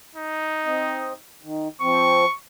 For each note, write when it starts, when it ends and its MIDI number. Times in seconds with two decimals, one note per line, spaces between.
0.15 1.20 63
0.65 1.13 60
0.65 1.13 75
1.43 1.68 51
1.82 2.25 53
1.82 2.25 60
1.82 2.35 85